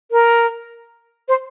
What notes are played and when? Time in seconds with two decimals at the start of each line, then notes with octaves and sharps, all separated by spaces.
0.11 A#4
1.28 C5